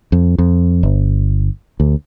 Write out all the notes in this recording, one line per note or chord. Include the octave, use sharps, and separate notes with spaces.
F2
F2
G1
D2